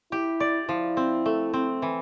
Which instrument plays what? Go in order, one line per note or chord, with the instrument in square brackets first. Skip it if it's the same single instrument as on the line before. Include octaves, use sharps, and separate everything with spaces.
[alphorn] E4 [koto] G4
[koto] D5
[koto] F3 [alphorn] E4
[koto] C4
A3
C4
E3